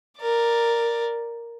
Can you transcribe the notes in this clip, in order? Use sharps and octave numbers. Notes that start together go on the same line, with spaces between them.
A#4 D5